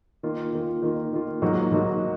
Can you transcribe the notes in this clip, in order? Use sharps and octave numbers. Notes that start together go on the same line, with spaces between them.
D#3 A#3 F4
D#3 A#3 F4
D#3 A#3 F4
D#3 A#3 F4
G#2 F#3 A#3 D#4 F#4
G#2 F#3 A#3 D#4 F#4